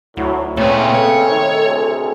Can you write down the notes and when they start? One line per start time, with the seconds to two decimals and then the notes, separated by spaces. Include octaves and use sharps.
0.17 D2 A2 F#3 E4
0.57 A#2 C#3 A3 C4 B4 C#5
0.94 A4 C#5
1.29 C3 D#3
1.65 D2 C3 G#4